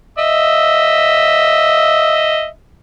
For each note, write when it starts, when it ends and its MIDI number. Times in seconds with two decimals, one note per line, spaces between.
0.18 2.46 75
0.18 2.46 76